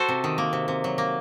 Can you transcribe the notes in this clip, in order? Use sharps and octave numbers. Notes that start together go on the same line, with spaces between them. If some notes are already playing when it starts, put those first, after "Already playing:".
Already playing: F#4 A4 C5
C3
D#3
A#3
C3
C3
F#3
A#3